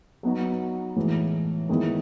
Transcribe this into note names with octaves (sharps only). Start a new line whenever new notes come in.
F#3 B3 D#4 F#4
A2 E3 G#3
D#3 G#3 B3 E4